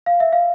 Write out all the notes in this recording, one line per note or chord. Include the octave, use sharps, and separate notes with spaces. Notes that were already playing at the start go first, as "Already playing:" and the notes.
F5
E5
F5